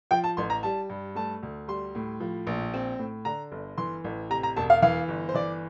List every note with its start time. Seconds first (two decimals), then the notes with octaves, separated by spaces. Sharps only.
0.11 F3 G5
0.24 A5
0.37 A1 C6
0.50 A#5
0.63 G3 A5
0.90 G2
1.15 A3 A5
1.43 D2
1.68 G3 C6
1.95 A2
2.20 F3
2.47 A#1
2.74 C4
2.99 A2
3.25 D3 A#5
3.52 G1
3.78 E3 C6
4.04 A1
4.30 C3 A#5
4.43 A#5
4.56 E1 A5
4.70 F5
4.82 E3 F5
5.08 G1
5.29 C5
5.35 E3 D5